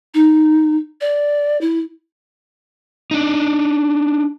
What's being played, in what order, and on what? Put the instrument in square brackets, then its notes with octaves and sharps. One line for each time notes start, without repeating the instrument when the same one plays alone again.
[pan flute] D#4
D5
E4
[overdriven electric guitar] D4 D#4